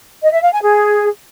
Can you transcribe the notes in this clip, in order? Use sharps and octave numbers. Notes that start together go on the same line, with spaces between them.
D#5
E5
F5
G#5
G#4